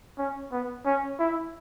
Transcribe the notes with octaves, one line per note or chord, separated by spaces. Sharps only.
C#4
B3
C#4
E4